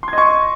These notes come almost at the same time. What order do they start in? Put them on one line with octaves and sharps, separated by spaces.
C6 G#6 D#5 C#6